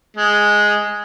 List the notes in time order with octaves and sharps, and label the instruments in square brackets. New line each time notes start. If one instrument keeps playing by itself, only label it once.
[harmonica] G#3